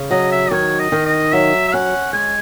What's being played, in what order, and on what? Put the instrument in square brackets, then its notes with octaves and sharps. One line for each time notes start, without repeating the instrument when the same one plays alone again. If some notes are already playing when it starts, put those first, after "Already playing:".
Already playing: [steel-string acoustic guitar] C#3
[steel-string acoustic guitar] F#3 [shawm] D#5
[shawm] E5
[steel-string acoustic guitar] D#3 [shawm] C#5
[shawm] D#5
[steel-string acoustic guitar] D#3
[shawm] D#5
[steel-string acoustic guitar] F#3 [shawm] E5
[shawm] E5
[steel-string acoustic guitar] C#4 [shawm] F#5
[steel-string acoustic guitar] G#3 [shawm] G#5